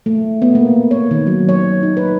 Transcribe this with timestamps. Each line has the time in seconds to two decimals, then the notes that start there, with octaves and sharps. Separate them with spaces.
0.06 A3
0.42 B3
0.55 A#3
0.91 C#5
1.11 D#3
1.27 F#3
1.49 C#5
1.83 D#4
1.97 B4